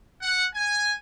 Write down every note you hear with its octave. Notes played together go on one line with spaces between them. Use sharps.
F#5
G#5